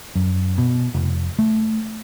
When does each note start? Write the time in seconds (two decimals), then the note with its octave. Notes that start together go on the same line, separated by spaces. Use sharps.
0.15 F#2
0.58 B2
0.94 F1
1.39 A3